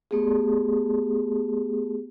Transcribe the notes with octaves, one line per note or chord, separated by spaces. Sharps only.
A3 B3 G4 G#4